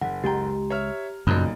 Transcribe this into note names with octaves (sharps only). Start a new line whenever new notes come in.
F#1 F#5
C#2 G#3 G4 G5 A#5
C#5 E5 F6
B1 F#2 A#2 C#3 F3 F#3 A#3 A#5